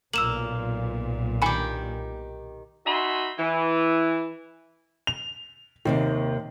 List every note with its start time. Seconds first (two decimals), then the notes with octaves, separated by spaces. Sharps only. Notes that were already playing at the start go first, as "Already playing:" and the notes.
0.14 B1 A#2 A#3 E6 E7 F#7
1.42 D#3 G4 G#5 B5
2.86 D#4 F#4 E5 G#5 B5 C6
3.38 E3
5.07 F7
5.85 D#2 C3 D#3 A#3